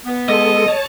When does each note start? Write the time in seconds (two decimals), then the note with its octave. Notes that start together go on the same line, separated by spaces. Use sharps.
0.06 B3
0.29 G#3 A4 D#5
0.68 C#5 A5